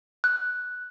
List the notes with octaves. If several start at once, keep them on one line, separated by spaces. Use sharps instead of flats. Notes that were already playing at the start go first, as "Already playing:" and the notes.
F#6